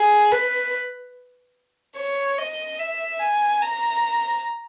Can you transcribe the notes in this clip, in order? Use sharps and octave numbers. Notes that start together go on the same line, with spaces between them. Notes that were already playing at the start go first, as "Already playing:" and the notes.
Already playing: G#4
B4
C#5
D#5
E5
G#5
A#5